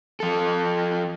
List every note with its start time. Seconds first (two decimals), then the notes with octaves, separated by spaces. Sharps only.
0.20 F3 A4